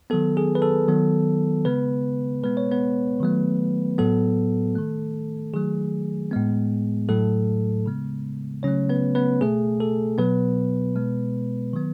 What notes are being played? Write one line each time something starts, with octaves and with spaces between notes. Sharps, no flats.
D#3 F#3 B3 A4
G#4
B4
A4
D#3 F#3 B3
C#3 G#3 B3 B4
B2 G#3 B3 B4
C#5
B3 B4
D#3 F#3 A3
A2 F#3 B3 A4
D#3 A3
D#3 F#3 A3 G#4
A2 G#3 B3
A2 F#3 A3 A4
C#3 G#3 B3
C#3 F#3 A3 C#4 C#5
B3 B4
B3 B4
B2 A3 G#4
A4
B2 F#3 B3 B4
B2 G#3 B3
D#3 F#3 B3